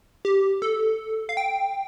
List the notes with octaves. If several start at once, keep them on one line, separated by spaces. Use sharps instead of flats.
G4
A4
F5
G5